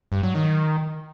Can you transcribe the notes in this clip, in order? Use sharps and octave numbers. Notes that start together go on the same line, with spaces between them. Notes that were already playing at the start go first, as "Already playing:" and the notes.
G2
F#3
D#3